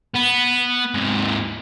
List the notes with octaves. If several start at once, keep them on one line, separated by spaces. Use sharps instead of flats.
B3
G#2 C3